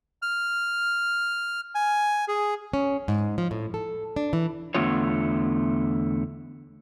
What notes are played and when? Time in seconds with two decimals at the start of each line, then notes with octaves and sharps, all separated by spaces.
0.22 F6
1.75 G#5
2.28 G#4
2.74 C#4
3.08 G#2
3.38 F3
3.51 A2
3.74 A4
4.16 D4
4.33 E3
4.75 E2 D3 A3 B3 F4 C#5